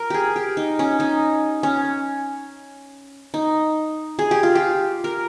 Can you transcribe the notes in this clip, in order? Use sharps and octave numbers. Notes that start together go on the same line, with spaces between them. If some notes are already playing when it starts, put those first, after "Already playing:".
Already playing: A#4
G4 G#4
G4
D#4
C#4
D#4
C#4
D#4
G#4
G4
F4
G4
A#4